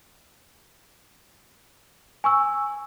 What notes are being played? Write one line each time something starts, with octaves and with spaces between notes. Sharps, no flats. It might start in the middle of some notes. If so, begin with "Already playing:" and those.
G#5 C#6 E6